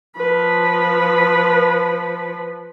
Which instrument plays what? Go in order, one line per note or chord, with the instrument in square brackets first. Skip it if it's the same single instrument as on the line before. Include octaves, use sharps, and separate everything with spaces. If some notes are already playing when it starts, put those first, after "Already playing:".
[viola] F3 B4